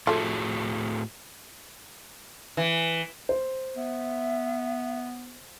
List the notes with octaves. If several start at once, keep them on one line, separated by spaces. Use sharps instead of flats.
A2 F3 A3 F#4 G#4
E3
C5
B3 E5